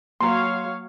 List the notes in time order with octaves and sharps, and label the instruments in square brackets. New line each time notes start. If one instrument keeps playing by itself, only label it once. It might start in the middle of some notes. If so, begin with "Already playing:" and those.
[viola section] F#3 C#5 F5 [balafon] A#3 A#5 [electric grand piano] C6